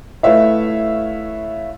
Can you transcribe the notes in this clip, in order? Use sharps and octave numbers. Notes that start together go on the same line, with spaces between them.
A3 E4 B4 C#5 E5 F5